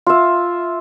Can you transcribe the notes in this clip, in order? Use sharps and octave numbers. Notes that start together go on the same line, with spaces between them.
F4 E5